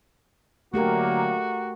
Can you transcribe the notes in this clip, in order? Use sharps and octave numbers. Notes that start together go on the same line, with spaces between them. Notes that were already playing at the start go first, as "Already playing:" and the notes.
D3 F#3 A3 A#3 F#4 G4 A#4